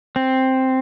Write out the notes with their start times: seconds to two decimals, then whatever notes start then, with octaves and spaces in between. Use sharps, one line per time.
0.16 C4